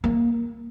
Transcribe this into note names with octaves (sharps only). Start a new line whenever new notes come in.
A#3